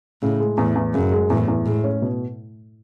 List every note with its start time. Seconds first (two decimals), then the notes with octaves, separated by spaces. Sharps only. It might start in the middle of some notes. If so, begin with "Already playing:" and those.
0.22 A2 C#3
0.40 G#3
0.57 E2 A2
0.75 E2
0.94 F#2 C#3
1.12 G#3
1.30 E2 A2
1.48 E2
1.66 A2 G#3
1.84 C#4
2.02 B2